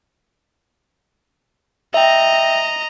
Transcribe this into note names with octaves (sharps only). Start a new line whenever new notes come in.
D#5 E5 G5 A#5